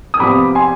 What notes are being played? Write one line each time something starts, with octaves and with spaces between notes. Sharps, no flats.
D#6
C2 C3 F3 B3 B5 D6
G#5 C6